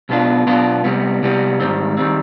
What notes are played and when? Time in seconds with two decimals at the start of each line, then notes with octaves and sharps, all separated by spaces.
0.09 B1 B2 B3 D4 F4
0.46 B1 B2 B3 D4 F4
0.84 C2 C3 G3 B3
1.22 C2 C3 G3 B3
1.60 G#2 D#3 G3 C4
1.97 D#3 G3 C4